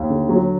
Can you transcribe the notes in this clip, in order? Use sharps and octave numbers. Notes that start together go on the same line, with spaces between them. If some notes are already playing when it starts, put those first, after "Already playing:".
Already playing: D#2
D3
F#3